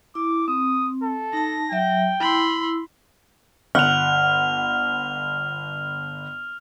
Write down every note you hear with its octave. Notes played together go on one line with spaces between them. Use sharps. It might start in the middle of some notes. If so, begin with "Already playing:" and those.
E4 D6
C4 D#6
A4
D#4 A5 A#6
F#3 E5 G5
E4 B5 C6 E6
G1 F#5 F6 F7